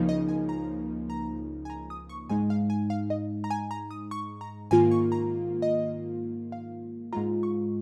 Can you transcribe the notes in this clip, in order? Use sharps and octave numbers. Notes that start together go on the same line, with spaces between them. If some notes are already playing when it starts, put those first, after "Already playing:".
Already playing: C#2 C#3 F3 A#3 D#4
D#5
G#5
A#5
A#5
G#5
A#5
D#6
C#6
G#2 G#3 D#4 G#5
F5
G#5
F5
D#5
A#5
G#5
A#5
D#6
C#6
A#5
G#2 D#3 A#3 F4 G#5
C#6
A#5
D#5
F5
G#2 G#3 F4 A#5
C#6